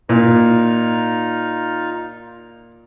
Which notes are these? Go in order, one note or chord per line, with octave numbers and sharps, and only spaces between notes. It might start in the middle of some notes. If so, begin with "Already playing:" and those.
A#2 D#4 F4 F6